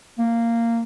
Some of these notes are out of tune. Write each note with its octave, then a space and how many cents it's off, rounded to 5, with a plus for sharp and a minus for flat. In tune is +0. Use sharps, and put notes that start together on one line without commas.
A#3 -10